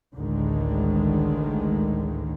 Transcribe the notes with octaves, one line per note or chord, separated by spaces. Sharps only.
A1 D2 A2 D3 D#3 G#3